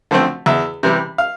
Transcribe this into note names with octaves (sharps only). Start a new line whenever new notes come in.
D3 F3 A3 C4
E2 E5
C3 E3 G3
F5